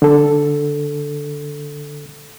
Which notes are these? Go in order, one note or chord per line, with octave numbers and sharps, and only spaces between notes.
D3 A4